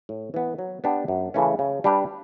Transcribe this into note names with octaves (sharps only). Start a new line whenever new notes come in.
A2
E3 B3
F#3
B3 D4 G4
F#2
C#3 E3 A3 C#4
C#3
G3 D4 G4 B4